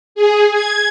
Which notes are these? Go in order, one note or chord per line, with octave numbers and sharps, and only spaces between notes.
G#4
G#6